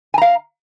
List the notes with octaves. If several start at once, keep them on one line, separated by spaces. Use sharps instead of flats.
F5 G#5 A#5